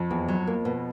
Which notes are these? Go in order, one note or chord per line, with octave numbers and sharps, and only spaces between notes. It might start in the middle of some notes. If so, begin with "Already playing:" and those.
Already playing: F2
E2
F#3
A#3
B2